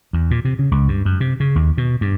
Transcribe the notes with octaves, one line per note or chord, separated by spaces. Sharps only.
E2
A#2
C3
C#3
C#2
G2
F#2
C3
C#3
D#2
B2
G2